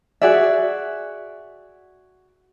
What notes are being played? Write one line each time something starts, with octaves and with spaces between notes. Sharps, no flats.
F#4 G#4 D5 E5